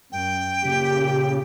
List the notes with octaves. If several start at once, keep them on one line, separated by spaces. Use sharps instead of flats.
F#2 G5
A#2 C#3 G4